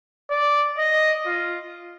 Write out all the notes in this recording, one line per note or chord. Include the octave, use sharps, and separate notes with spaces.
D5
D#5
F4